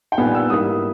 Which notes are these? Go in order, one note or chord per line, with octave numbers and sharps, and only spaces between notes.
G5
A#2 G3 B3 D#4 G#5
E6
G#2 G3 A#3 E4 D#6